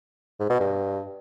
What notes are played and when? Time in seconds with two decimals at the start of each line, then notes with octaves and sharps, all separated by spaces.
0.39 G#2
0.50 B2
0.60 G2